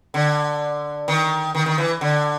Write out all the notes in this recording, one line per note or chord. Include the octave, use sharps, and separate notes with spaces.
D3
D#3
D#3
D#3
E3
D3